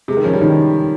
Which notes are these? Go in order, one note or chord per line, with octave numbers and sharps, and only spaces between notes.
C3 G#3
D#3
F3 C#4
G3
D#3 F3